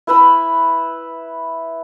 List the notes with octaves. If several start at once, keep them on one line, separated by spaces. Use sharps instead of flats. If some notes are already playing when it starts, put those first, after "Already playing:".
E4 B4 E5 B5